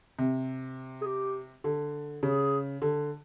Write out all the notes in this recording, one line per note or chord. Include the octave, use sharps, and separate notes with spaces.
C3
G#4
G4
D3
C#3 G#4
D3